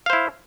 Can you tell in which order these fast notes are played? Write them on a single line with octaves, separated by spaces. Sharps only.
F5 C5 E4